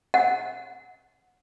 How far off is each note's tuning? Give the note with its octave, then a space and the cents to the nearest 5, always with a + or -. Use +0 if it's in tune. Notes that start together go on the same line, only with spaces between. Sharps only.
F#5 -20